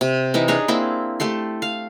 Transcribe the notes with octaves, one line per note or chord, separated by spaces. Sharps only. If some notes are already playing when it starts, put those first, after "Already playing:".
C3
E3 D#4 E4
D4 D#4 G#4 C#5
A#3 C4 E4
A3 G4 A4 C6
F5